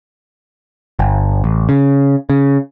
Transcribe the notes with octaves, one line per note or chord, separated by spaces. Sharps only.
G1
A1
C#3
C#3